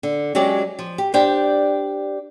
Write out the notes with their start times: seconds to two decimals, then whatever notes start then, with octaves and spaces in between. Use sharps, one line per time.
0.03 D3
0.35 F#3 G#3 C#4 G4 D5
0.79 F3
0.98 G4
1.14 D4 G4 C5 D5 G5